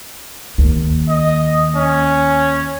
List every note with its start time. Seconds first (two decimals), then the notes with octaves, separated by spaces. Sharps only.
0.58 D#2
1.09 D#5
1.76 C#4